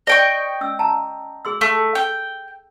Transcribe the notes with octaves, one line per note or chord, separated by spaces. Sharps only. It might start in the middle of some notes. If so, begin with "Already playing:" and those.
C5 D5 D#5 G5 C#6 D6
C#4 E6
A5 A#5
G#4 C6 E6
A3
G5